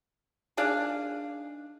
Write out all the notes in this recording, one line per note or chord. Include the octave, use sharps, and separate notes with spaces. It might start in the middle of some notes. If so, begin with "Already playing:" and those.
D#3 D4 G#4 F5